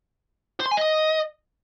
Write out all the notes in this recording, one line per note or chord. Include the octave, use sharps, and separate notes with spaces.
C5
C6
G#5
D#5